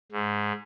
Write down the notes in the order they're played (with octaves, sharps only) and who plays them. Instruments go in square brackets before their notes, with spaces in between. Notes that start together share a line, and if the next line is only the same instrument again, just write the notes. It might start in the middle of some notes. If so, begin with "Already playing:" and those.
[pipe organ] G#2